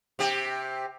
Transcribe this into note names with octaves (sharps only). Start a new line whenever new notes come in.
C3 G4